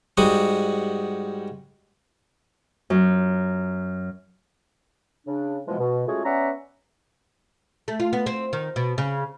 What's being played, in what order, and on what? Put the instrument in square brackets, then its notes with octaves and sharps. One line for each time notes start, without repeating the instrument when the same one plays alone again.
[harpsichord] G#2 G3 F#4 F#5 D#6
[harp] F#2
[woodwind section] C#3 D4
B2 E3 F3 G#3
B2
G#3 A3 C#4 F4 F#4 G#4
B3 C#4 D5 E5 F#5 A#5
[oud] A3
F4
B3
C4
D#3
B2
C#3